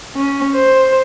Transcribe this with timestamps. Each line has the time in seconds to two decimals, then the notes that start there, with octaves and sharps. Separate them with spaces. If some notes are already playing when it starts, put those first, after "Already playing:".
0.15 C#4
0.55 C5